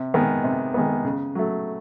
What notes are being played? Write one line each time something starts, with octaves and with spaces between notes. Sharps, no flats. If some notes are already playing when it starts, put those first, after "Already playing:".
Already playing: C3
D#3 G#3 B3
C3
D#3 G#3 B3
C#3
F#3 A3